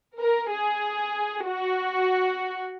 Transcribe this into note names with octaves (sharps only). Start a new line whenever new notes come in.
A#4
G#4
F#4